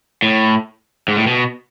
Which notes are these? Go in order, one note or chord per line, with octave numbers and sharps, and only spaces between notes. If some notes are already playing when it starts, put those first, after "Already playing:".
A2
G#2
A2
B2